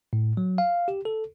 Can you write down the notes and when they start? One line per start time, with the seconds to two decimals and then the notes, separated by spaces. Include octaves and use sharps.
0.13 A2
0.37 F#3
0.58 F5
0.88 G4
1.05 A4